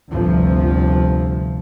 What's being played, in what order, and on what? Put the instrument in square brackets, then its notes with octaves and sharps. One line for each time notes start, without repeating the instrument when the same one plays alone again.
[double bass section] G1 D2 C3 F3